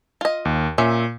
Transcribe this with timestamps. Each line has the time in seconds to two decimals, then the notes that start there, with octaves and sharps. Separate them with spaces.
0.21 F4 D#5
0.45 D#2
0.78 A#2 C#4 E5